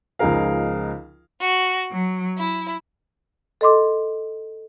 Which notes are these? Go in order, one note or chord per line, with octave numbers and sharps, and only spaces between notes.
C#2 F3 D#4 G#4 A#4 F5
F#4
F#3
E4
A4 D#5 C6 D6